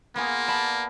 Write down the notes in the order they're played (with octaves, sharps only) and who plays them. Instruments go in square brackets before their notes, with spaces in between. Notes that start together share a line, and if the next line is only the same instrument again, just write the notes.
[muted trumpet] A#3 [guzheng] B3 F4 G#4
[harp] D5 A5 B5